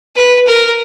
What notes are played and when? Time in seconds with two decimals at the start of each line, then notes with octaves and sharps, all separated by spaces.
0.16 B4
0.47 A#4